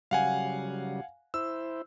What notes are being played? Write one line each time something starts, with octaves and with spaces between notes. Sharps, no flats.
C#3 F#3 G3 F5 F#5 G#5
E4 C5 E6